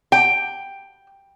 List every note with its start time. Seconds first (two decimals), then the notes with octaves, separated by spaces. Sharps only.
0.12 G5